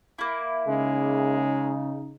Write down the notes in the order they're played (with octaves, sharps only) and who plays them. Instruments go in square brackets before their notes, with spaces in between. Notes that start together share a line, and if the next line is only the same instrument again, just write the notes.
[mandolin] A#3 E4
[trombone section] C#3 D#4 [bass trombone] G#3